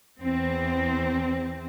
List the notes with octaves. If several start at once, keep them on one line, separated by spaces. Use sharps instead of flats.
E2 C4